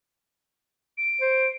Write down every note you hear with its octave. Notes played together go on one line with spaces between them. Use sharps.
D7
C5